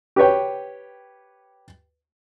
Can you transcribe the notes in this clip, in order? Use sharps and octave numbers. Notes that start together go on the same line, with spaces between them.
G4 B4 C#5 G5